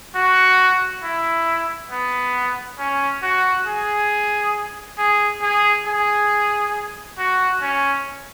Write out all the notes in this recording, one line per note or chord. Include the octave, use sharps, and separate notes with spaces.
F#4
E4
B3
C#4
F#4
G#4
G#4
G#4
G#4
F#4
C#4